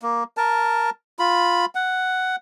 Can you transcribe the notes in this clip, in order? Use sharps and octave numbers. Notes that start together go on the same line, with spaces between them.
A#3
A#4 A5
F4 B5
F#5